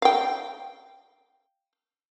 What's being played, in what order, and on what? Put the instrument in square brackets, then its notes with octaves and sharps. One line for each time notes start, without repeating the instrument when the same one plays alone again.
[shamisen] F5 G5